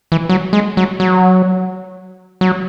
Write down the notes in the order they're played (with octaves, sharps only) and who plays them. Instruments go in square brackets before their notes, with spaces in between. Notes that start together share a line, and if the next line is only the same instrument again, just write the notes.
[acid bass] E3
F#3
G#3
F#3
F#3
F#3